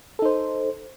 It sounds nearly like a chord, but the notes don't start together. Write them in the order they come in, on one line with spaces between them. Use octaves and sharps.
A4 D#4 C5